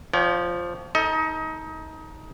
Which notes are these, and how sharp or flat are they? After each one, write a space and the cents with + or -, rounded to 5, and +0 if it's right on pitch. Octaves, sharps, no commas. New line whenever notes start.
F3 +0 C#5 +40 G5 -20
D#4 +25 A4 +10 D#5 +30